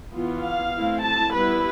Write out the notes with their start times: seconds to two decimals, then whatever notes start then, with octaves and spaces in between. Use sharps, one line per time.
0.13 E3 B3 F4
0.43 F5
0.74 A3 C4 E4
1.04 A5
1.34 G3 B3 E4 B4